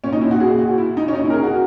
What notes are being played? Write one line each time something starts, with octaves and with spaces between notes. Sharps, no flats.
A#2 C#4
D#4
E4
F#4
G#4
F#4
E4
D#4
C#4
D#4
E4
A#4
G#4
F#4